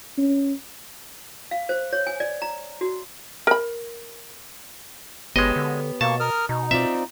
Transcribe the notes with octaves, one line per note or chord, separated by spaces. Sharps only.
C#4
F5
C5
C#5
G#5
D5
A#5
F#4
A#4 B5
G1 G#3 B3 G4 C#5 D#5
D3
B2 A#3 A5 C#6
A#4 D#6 F6
B2 D#4
C4 F4 D5 E5